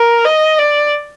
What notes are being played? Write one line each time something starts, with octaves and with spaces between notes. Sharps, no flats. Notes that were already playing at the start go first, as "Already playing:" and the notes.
Already playing: A#4
D#5
D5